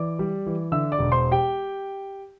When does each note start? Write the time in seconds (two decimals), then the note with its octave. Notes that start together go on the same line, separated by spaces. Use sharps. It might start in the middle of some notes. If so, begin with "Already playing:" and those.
Already playing: E3 D5 D6
0.19 G3
0.46 E3
0.72 D3 E5 E6
0.92 D5 D6
0.99 E1
1.12 C5 C6
1.31 G4 G5